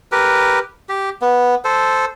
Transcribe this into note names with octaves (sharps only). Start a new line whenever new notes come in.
G4 A#4 B4
G4
B3
A4 C5